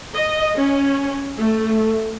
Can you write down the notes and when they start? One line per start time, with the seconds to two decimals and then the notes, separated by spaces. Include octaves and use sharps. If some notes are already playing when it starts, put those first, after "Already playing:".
0.14 D#5
0.57 C#4
1.37 A3